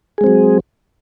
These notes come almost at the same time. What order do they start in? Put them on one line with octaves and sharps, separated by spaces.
G#4 G#3 C4 F#3